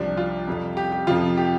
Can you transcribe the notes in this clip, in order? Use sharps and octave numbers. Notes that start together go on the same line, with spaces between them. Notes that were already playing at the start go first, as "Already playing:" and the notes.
Already playing: C2 C3 F3 D4
F4
F2 C3 G3
G4
G4
F2 C3 F3 F4
G4